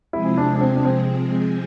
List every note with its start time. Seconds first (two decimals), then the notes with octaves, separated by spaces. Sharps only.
0.13 C3 F3 G#3 C4 E4 G#4
0.37 D4
0.55 D4
0.61 C4
0.76 D4
0.85 C4